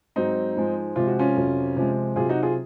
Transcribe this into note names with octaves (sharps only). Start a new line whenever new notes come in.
G#2 F#3 C4 D#4
G#2 F3 G#3
C3 F3 G#3 F4
F#4
C#4 F4
F2 C3 F#3
C3 F3 G#3
C3 F#3 F4 G#4
D#4 F#4
F4 G#4